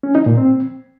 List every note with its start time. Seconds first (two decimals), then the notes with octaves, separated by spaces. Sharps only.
0.03 C#4
0.15 D#4
0.26 A#2
0.38 C4